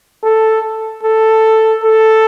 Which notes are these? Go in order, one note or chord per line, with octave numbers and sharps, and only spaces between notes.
A4
A4
A4